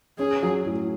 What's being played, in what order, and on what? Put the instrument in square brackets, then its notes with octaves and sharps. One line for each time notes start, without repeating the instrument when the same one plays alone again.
[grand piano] C#4 [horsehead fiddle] G#4
[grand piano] F#3
A2